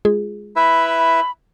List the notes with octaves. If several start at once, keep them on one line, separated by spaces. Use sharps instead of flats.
G#3 F4 G#4
E4 B4 E5 B5